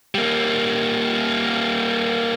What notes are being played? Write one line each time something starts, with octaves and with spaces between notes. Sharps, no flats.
G3 A#3